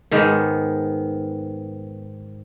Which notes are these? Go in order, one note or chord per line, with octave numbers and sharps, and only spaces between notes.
G#2 D#3 B3